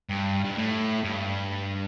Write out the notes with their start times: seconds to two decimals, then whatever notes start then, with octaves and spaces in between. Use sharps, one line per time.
0.09 G2
0.45 G2
0.57 A2
1.04 G2